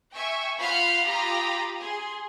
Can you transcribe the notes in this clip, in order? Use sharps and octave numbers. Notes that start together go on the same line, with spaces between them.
E5 G5 G#5 C#6
F4 F#5 B5 F6 G6 C7
F4 G4 A#5 B5 D#6
G#4 C6